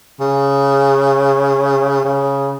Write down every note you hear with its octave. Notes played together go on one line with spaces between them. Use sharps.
C#3
C#3